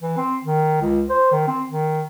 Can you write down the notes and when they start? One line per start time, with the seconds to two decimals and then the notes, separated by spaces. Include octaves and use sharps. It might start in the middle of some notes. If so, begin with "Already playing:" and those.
0.02 E3
0.17 C4
0.44 D#3
0.82 C#2
1.09 C5
1.31 D#3
1.48 C4
1.70 D#3